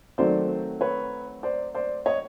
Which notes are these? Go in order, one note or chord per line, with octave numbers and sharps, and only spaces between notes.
D#3 F#3 A3 C4 C5 D5
B4 C#5
C5 D5
C5 D5
C#5 D#5